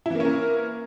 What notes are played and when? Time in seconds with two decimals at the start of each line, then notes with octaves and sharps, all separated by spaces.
0.06 E4
0.10 E3
0.15 A#3
0.20 C#4
0.25 A#4